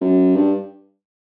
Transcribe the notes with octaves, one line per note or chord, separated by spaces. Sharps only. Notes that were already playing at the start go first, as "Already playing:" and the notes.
F#2
G2